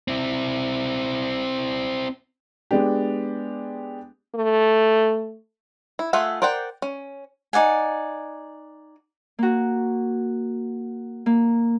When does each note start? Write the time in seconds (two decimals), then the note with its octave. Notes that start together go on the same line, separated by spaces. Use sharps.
0.08 C4 E4
2.71 G#3 B3 D4 G4
4.35 A3
5.99 E4
6.13 A3 F4 G#4 E5 F#5
6.42 A#4 C5 D5 F#5 G5
6.82 C#4
7.53 D#4 D5 F#5 G#5
9.39 A#3 F#4
11.26 A#3